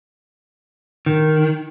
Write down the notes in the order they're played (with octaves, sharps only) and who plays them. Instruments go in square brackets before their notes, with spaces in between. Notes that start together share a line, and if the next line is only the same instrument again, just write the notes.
[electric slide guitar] D#3